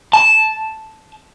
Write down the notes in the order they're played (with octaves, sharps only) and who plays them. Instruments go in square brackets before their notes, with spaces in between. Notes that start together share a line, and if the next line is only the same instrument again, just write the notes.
[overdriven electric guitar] A5